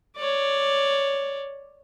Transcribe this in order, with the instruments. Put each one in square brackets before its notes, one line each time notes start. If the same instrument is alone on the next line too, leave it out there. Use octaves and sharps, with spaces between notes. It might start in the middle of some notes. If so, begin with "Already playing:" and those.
[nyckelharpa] C#5 D5